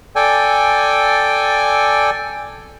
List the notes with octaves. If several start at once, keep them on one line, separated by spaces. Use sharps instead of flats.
A4 D5 G5 G#5